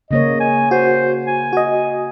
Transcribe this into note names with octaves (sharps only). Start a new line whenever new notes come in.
C#3 A#3 C#5 D#5
G#5
F#4 C5
G#5
F#4 D#5